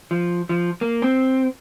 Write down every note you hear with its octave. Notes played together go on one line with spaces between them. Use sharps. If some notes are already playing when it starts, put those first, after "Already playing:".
F3
F3
A#3
C4